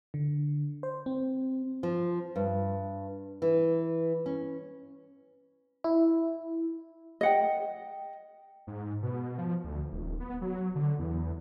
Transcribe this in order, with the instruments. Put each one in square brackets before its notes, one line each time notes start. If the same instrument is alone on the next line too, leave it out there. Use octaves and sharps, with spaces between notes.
[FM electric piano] D3
C5
C4
[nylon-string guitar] F3
G2
E3
C#4
[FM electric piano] E4
[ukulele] D#5 F#5 G5
[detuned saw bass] G#2
B2
F3
D2
D#1
B3
F#3
D3
E2